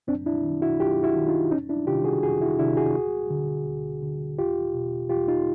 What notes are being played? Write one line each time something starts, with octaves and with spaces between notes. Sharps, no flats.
F#2 C4 D4
D4 E4
D#3
E4 F#4
F#2 F4 G4
E4 F#4
D#3
D#4 F4
F2 C#4 D#4
D4 E4
C3 D#3 F4 G4
F#4 G#4
F2 F#4 G#4
E4 F#4
C3 D#3 D4 E4
F#4 G#4
D2
D3
D2
D3
E2 F4 G4
B2
E2 F4 G4
D#4 F4